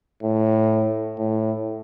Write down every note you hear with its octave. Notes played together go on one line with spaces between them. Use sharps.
A2
A2